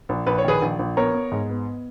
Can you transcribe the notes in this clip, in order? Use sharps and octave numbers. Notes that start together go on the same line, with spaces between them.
A#1
A#1 B4
C#5
D#3 G#4 B4
A#1
A#1
B3 A#4 C#5
B3
G#2
B3